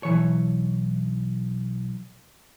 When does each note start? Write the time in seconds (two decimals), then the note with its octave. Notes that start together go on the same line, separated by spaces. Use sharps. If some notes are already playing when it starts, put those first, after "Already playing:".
0.03 B1 E3 C#5